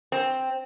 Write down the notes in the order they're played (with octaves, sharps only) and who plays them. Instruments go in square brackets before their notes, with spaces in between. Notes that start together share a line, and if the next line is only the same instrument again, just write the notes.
[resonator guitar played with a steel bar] C4